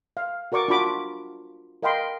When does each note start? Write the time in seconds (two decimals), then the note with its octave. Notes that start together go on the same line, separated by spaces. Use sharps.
0.17 F5
0.52 F#4 A#4 D5 C#6 D6
0.68 D4 F4 F#4 D5 B5 D6
1.82 A#4 D#5 F5 G5 B5 C6